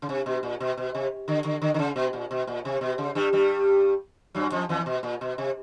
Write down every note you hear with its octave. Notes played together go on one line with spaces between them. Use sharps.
C#3
C3
B2
A#2
B2
B2
C3
D3
D3
D3
D3
C#3
B2
A#2
B2
A#2
C3
B2
C#3
G2 G3
G2 G3
F#2 F#3
F2 F3
E2 E3
B2
A#2
B2
C3